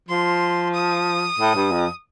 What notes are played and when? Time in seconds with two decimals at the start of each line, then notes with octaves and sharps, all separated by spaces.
0.09 F3 C6
0.74 D#6
1.39 A2
1.55 G2
1.71 F2